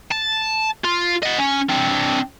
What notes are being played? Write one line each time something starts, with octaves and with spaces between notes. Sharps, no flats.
A5
F4
D#5 F#5
C#4
C4 D4